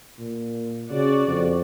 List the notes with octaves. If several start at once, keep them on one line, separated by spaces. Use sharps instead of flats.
A#2
C#3 F#4 D5
F2